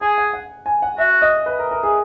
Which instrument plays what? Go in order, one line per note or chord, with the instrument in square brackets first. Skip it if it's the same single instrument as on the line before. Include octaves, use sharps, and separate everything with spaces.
[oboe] G#4 [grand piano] G#5
[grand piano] F#5
F#5
G#5
F#5
[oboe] F#4 [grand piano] E5
[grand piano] D#5
B4
A#4
A#4
G#4